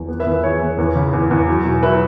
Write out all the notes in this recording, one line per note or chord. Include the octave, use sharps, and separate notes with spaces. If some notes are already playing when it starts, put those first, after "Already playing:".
Already playing: E2
B3
B4 E5
E2
B4 E5
E3 G#4 C#5
B3
E2
C#3
E2
E2
F#3
B2
F#3 B4 E5